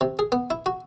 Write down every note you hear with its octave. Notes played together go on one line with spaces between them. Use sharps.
C3
G#4
B3
E4
F#4